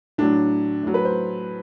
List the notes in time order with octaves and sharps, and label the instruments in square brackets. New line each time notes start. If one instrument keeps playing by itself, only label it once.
[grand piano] A2 F#3 D4
A2 F#3
B4
C5